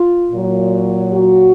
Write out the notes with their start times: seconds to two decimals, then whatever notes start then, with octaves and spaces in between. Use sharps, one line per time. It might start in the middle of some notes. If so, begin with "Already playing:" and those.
Already playing: F4
0.32 A#2 F#3
1.13 F#4